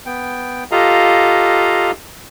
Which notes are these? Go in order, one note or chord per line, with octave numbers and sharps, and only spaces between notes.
B3 G5
F4 G4 A4 D#5 F5 A#5